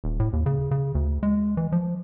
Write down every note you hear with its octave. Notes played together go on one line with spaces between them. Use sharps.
D#1
A2
D#2
C#3
C#3
D2
G#3
E3
F3